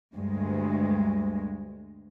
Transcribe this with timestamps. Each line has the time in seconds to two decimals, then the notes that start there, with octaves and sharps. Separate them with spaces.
0.13 D2 G2 G#3